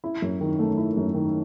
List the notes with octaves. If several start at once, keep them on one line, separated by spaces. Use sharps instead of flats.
E4
F#2
D#3
A3
E4
F#2
D#3